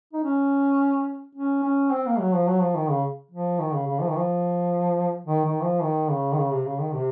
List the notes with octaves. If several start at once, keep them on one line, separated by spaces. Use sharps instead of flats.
D#4
C#4
C#4
C#4
C4
A#3
F#3
F3
F#3
F3
D#3
C#3
F3
D#3
C#3
C#3
F3
D#3
F3
D#3
D#3
F3
D#3
C#3
D#3
C#3
C3
C#3
D#3
C3